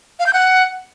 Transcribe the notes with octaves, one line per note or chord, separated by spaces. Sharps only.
F5
G6
F#5